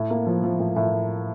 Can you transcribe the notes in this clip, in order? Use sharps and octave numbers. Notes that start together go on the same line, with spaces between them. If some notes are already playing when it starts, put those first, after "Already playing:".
Already playing: A2
A#3
F3
F3
A2
A2